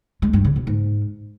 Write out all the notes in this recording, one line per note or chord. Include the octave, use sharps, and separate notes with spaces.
G#3
G2
C#3
B2
G#2